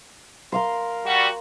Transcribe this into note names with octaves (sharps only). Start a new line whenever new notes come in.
A#4 F5 C6
G3 F#4